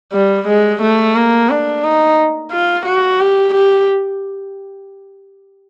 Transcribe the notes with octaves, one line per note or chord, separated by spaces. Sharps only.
G3
G#3
A3
A#3
D4
D#4
F4
F#4
G4
G4